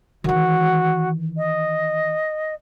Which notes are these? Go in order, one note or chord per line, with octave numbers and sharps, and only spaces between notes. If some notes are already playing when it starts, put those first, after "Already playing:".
D#3 E3 F#4
D#5